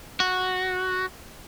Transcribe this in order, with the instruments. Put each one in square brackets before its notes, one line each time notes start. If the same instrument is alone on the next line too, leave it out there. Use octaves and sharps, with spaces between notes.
[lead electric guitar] F#4